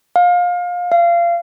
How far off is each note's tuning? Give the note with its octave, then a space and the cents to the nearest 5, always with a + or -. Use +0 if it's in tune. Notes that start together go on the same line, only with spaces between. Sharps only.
F5 +25
F5 -30